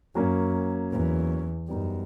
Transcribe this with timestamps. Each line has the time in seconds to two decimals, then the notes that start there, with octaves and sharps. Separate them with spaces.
0.15 F#2 F#3 A#3 C#4
0.92 E2
1.68 F#2 G3 B3 D#4